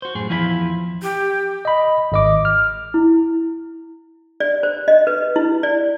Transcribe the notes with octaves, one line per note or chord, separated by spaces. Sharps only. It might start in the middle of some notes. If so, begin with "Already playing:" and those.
F#4 C5
F#2 A2 G#4
E2 F3 E4 D#5 B5
G4
D#5 B5
G#1 D#5 D6
F6
E4
D5
C5
D#5
B4
E4
D5